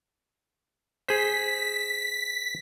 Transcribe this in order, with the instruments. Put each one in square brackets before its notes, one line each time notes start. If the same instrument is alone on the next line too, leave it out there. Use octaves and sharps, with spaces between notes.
[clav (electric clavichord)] G#4 C5 [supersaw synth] B6